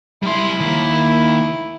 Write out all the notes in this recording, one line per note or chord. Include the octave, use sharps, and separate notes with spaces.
G3 E4 C6
D#3 A#3